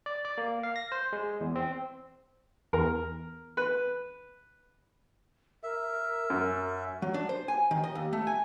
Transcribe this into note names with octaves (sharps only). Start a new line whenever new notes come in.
D5
D5
A#3
F5
A#6
C5
G#3
E2
C4
E2 A#4
B4
A#4 E5
F#2
F#3
D4
C5
G#5
D#3
D#5
D#2
A3
G#5